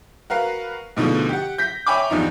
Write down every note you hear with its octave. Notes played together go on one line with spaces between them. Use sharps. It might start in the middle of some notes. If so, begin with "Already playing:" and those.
F#4 A#4 B4 F5
G#2 B2 D3 F3 A3
G4 F#5
G6 A#6 B6
C#5 E5 G5 G#5 B5 D6
E2 G2 F3 D#4 A#5